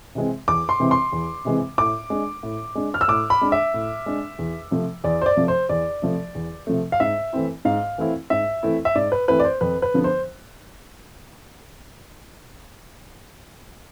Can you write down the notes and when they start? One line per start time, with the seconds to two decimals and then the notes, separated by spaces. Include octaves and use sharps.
0.15 C3 E3 G#3 C4
0.48 E2 D6
0.69 C6
0.80 C3 E3 G#3 C4
0.91 C6
1.12 E2
1.45 C3 E3 G#3 C4
1.78 A2 D6
2.10 G#3 D4
2.43 A2
2.75 G#3 D4
2.94 F6
3.01 E6
3.08 A2 D6
3.30 B5
3.41 G#3 D4
3.52 E5
3.74 A2
4.06 G#3 D4
4.39 E2
4.71 C3 F3 A3
5.04 E2 D5
5.22 C5
5.26 D5
5.36 C3 F3 A3
5.48 C5
5.69 E2 D5
6.02 C3 F3 A3
6.35 E2
6.67 C3 F3 A3
6.92 F5
7.00 G#2 E5
7.33 E3 A3 C4 E4
7.65 G#2 F5
7.98 E3 A3 C4 E4
8.30 G#2 E5
8.63 E3 A3 C4 E4
8.85 E5
8.95 G#2 D5
9.12 B4
9.28 E3 A3 C4 E4 B4
9.40 D5
9.45 C5
9.61 F2 B4
9.82 B4
9.94 D3 F3 B3
10.04 C5